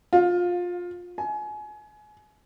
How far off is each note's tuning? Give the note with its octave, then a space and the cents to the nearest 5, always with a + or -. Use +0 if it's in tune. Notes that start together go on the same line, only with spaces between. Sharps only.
F4 +20
G#5 +30